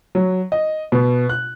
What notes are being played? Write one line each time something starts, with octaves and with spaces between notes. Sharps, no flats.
F#3
D#5
B2
F#6